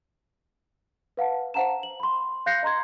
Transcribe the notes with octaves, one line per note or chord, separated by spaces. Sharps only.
B4 F5 F#5 A5
C5 F5 F#5 A5 A#5 E7
F#7
B5 C6
F5 F#6 G6 A#6 C7 C#7
D#5 A#5 C6 G#6